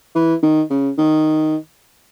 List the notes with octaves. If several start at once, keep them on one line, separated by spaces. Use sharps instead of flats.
E3
D#3
C#3
D#3